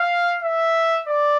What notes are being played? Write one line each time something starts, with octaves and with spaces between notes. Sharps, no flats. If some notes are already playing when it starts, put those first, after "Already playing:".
Already playing: F5
E5
D5